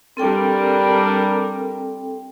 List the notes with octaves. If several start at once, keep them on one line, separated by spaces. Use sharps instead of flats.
G3 C4 D4 A4 A#4 G5